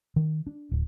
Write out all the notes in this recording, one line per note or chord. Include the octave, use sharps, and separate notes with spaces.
D#3
D4
D1